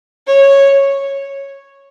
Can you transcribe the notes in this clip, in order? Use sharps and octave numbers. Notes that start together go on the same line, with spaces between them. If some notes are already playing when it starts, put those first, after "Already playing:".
C#5